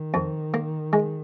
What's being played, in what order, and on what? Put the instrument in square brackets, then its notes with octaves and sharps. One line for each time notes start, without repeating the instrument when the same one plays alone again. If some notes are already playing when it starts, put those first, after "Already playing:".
Already playing: [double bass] D#3
[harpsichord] F2
A#3
G#3